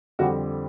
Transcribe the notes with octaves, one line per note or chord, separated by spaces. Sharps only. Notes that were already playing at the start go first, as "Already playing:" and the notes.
F2 D3 G3 C4 F#4